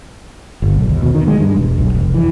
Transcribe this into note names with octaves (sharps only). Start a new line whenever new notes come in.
G1
B1
D#2
B2
D#3
G#3
G2
E1
B1
F1
E3